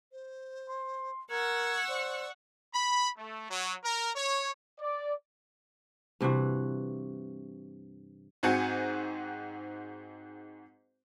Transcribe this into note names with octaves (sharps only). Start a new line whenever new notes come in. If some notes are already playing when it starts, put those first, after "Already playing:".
C5
C6
A#4 F#5 C#6 E6 G#6
C5 D5
B5
A3
F#3
A#4
C#5
D5
G2 C3 E3 F#4
G#2 C4 F#4 G#5 G6 C#7